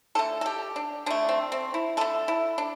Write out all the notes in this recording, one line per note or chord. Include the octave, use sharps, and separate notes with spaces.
D3 A3 A4
A4
G4
D4
D3 A3 D4
C4
C4
E4
D3 A3 A4
E4
D4